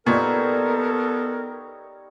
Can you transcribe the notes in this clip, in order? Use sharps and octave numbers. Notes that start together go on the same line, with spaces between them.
A#2 G3 B3 D#4 A4 A#4 C#5